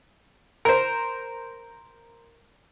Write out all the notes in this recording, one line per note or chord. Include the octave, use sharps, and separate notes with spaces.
A#4 C5